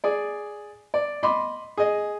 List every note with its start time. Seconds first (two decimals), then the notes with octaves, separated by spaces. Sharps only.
0.04 G#4 D5
0.94 D5
1.23 D#5 B5 C6 D6
1.77 G#4 D#5